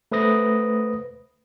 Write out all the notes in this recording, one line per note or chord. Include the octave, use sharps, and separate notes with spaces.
A3 B4 C5 D#6 A#6